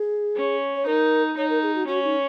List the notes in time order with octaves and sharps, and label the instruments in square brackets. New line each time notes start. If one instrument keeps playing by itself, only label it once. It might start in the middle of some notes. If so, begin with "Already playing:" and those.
Already playing: [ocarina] G#4
[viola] C#4
[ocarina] C#5
[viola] D#4 [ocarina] A#4
[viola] D#4 [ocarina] C#5
[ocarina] A#4
G#4
F#4
[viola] C#4 [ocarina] F#4
[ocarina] D#4